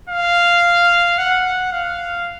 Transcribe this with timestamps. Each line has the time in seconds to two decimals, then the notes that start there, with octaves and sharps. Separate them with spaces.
0.09 F5
1.18 F#5
1.72 F5